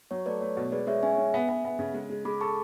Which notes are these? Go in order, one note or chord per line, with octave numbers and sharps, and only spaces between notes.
F#3 C#5
A3 B4 D5
A3 C#5
B2
G#3 B4 D5
G#3 C#5 E5
C#4 E5 G#5
C#4
B3
B3
B3
C#3
G#3
G#3
G#3 B5 D6
A4 A5 C#6